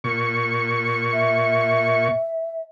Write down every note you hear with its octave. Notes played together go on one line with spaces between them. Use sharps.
A#2 C#6
E5